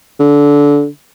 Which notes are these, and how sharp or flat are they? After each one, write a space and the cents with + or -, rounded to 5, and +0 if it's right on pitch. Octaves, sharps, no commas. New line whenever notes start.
D3 -20